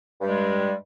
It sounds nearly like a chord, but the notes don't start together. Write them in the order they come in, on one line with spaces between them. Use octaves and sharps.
G2 G3 G#3